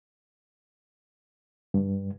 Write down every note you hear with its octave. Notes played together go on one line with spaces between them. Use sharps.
G2